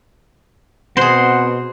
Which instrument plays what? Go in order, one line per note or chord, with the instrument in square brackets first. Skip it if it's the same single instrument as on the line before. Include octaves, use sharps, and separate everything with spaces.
[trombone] B2 [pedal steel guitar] C4 C6 [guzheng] G#4 C5 [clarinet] F#5